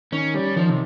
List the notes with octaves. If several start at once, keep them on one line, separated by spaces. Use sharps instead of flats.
D#3 C#4
G3 C#4
D#3 F3
C3